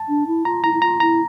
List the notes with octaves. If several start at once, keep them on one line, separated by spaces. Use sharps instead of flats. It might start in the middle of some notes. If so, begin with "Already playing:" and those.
Already playing: A5
D4
E4
F4 A#5
E4 A#5
E4
F4 A#5
E4 A#5